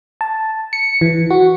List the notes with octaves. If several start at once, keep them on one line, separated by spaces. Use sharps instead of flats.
A5
C#7
E3
F#4